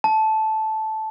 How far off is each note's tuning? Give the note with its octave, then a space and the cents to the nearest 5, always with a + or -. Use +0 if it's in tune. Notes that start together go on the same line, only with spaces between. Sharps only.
A5 -10